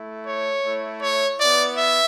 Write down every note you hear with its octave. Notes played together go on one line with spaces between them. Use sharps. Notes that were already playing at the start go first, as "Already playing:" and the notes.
Already playing: A3 E4
C#5
A3 E4
C#5
B3 E4 D5
E5